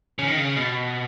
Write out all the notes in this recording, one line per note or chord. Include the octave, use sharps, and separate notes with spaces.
C#3
D#3
C#3
B2